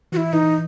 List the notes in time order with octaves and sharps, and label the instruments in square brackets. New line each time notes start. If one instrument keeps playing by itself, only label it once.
[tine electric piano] E3 [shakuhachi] F#4
[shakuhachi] E4
[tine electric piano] E3 [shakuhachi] D#4